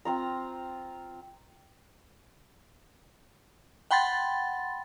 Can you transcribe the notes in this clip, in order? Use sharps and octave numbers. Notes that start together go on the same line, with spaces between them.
C4 F4 A#5
F#5 G5 B5 C6 A6